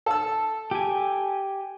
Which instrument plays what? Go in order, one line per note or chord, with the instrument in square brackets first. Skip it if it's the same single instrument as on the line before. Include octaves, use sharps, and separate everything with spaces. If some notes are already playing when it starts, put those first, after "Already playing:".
[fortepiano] A4 E6
[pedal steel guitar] G4 G#5